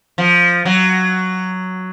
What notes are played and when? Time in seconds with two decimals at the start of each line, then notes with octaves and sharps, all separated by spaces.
0.18 F3
0.65 F#3